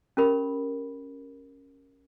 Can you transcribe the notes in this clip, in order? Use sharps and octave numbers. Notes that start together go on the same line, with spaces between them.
C#4 G4 A#4 B5